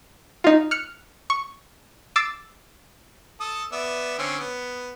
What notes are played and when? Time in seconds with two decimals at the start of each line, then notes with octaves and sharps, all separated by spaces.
0.44 D#4 F4
0.71 F6 F#6 C#7
1.30 C#6
2.16 D6 E6 A6 C7
3.40 A4 D#6
3.72 B3 D5 E5
4.19 D3 C4 C#4
4.39 B3